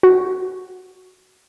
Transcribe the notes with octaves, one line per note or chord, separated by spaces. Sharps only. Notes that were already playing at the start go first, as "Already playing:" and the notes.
F#4